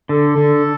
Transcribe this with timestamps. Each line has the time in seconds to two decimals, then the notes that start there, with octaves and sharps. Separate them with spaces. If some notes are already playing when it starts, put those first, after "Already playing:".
0.09 D3 A4
0.38 D3